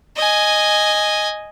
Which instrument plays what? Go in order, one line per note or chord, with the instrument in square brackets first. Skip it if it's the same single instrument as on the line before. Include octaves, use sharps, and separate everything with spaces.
[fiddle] D#5 G#5